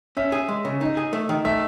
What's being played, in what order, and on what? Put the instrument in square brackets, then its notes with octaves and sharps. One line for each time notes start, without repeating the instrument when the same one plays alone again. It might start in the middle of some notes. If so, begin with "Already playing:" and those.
[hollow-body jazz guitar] C#4 [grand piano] E5
[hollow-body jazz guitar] G#4
G#3
C#3
D#4
G#4
A3
D#3
[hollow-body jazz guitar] A3 [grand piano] E5